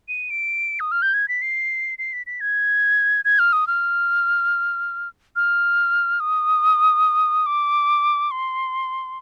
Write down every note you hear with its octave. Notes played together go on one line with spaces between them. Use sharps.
D#7
D7
D#6
F6
G6
G#6
B6
C7
C7
B6
B6
G#6
G#6
F6
D#6
F6
F6
D#6
D6
C6